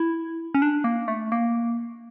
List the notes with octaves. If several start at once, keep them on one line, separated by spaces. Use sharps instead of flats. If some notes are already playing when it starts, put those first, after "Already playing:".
Already playing: E4
C#4
D4
A#3
A3
A#3